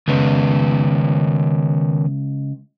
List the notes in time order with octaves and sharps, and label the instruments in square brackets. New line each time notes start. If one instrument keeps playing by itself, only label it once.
[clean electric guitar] C#2 [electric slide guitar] D#3 B3 B4